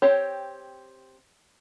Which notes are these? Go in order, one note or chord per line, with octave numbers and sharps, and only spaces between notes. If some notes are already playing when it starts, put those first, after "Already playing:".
C4 G4 C#5